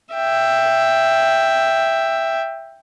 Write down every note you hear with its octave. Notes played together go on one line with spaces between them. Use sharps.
E5 G5